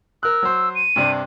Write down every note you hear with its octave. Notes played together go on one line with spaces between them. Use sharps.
A#4 E6 F#6
F#3 C5
D#7
G2 C3 D4